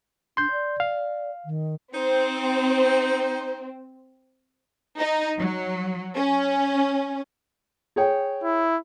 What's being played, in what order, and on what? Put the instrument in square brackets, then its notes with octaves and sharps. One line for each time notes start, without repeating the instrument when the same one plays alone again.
[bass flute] D4 [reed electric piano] C6 G6
[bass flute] D5
[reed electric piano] F5
[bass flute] D#3
[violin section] C4 [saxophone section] D#4 C5
[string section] D#4
F#3
C#4
[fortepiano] G#4 C#5 G5
[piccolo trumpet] E4